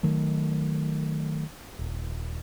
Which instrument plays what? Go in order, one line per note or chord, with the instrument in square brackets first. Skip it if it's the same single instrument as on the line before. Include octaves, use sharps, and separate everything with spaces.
[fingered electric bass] D#3 F#3 A3
D#1